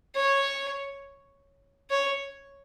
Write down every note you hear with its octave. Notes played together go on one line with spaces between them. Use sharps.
C#5
C#5